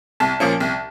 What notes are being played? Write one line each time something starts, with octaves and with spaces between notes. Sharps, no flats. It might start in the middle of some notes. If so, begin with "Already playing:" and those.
C2 A5
A#2 F3 A#3 C#4
C2